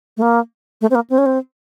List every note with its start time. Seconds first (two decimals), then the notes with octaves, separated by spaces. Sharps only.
0.17 A3
0.22 A#3
0.81 A3
0.91 C4
0.95 A#3
1.10 C4
1.18 C#4
1.26 C4